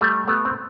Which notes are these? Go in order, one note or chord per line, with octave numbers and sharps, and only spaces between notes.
G3 A3
A3 B3
C4